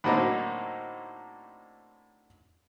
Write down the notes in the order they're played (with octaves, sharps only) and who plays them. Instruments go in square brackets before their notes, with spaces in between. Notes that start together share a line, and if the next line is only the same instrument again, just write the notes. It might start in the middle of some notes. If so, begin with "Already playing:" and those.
[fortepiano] A2 D3 F#3 A#3 C4 D#4